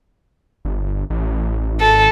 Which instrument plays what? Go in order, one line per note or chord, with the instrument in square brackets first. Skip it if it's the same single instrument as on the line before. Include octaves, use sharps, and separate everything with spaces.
[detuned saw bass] G1
A1
[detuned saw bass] G#1 [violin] A4